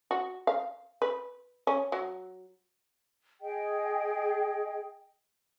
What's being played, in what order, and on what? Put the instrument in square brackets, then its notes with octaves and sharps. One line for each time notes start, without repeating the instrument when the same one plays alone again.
[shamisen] F#4
F5
B4
C#4
F#3
[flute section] G#4 D#5 G5